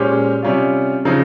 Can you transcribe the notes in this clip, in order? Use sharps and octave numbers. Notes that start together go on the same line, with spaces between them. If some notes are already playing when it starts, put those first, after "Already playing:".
Already playing: A#2 G#3 C#4 G4 C5
C3 G3 C#4 F4
C#3 F3 C4 D#4